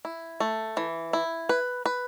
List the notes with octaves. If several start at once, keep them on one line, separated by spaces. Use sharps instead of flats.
E4
A3
E3
E4
B4
B4